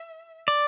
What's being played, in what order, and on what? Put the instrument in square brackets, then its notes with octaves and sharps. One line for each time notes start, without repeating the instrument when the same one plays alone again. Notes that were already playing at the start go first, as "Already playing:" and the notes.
Already playing: [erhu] E5
[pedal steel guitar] D5